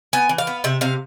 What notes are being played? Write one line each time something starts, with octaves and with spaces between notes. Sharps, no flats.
B3 G#5
E3
F5
B3
C3 E5
C3 F5